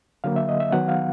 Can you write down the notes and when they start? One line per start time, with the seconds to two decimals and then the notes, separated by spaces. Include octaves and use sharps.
0.24 D3 F#3 A#3 F5
0.36 E5
0.49 D#5
0.60 E5
0.72 D#3 F#3 B3 F#5
0.88 F5